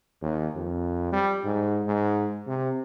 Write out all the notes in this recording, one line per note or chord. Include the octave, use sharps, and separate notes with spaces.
D#2
F2
G3
G#2
G#2
C3